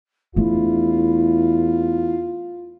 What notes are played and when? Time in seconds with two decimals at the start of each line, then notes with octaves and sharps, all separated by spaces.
0.36 E2 A3 D4 E4 F4